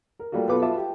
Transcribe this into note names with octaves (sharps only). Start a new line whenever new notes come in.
A#4
G3 A3 A#3 F4 F#4
B1 B3 F4 A4 B4 D6
F4 F#4 E5 A5 D6
G4